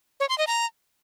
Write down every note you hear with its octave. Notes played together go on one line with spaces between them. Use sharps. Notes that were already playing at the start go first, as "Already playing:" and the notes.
C#5
C6
D#5
A#5